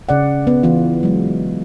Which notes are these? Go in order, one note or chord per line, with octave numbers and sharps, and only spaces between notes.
C#3 D5 F#5
B3
E3 B3 F4
F#3 G#3